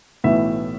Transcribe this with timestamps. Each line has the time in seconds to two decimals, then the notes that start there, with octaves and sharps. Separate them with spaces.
0.24 B1 A2 E3 E5